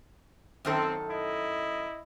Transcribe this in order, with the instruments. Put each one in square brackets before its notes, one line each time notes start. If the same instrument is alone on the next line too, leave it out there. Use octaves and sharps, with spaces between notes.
[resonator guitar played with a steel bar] F#2 D#3 A4 [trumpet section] C4
[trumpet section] E4 D#5